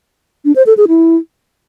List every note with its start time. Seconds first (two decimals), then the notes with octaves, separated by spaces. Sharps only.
0.45 D4
0.56 C5
0.66 A4
0.77 G#4
0.88 E4